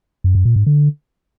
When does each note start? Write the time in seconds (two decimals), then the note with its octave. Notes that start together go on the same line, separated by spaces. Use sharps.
0.24 F#2
0.35 F#2
0.45 A#2
0.56 G#2
0.66 D3